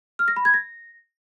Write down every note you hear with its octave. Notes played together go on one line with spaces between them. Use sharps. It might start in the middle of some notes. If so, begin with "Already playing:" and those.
F6
A#6
B5
G#6
A#6